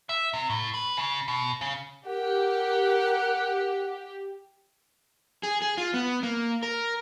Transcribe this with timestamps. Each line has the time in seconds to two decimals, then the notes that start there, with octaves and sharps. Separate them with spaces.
0.09 E5
0.33 C3
0.50 A2
0.74 B4
0.97 C#3
1.28 B2
1.61 C#3
2.07 G4 A#4 F#5
5.43 G#4
5.62 G#4
5.78 F4
5.94 B3
6.23 A#3
6.63 A#4